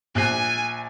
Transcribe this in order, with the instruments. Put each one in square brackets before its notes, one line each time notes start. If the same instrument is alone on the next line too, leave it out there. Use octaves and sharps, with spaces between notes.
[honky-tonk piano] A#1 F#6 C7 [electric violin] G#5